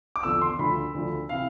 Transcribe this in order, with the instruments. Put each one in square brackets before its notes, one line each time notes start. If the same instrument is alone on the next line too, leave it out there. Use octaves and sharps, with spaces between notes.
[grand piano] D6
E2 D3 F3 E6
C6
D2 D3 F3 B5
D2 D3 F3
C3 E3 F5